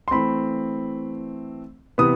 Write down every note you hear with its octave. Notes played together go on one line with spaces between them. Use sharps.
C6
E3 A3 C4 B5
C3 E3 B3 D#6